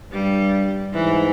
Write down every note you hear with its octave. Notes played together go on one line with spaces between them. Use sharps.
G2 G3
G#2 E3